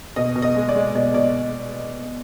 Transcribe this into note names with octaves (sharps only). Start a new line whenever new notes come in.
B2 D#5
B2
D#5
G#3
D5
G#3
B2 D5
B2 D5